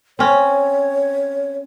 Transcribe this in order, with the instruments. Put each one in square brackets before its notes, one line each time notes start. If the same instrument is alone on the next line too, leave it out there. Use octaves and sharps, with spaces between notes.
[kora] C4 C#4 [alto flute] C#5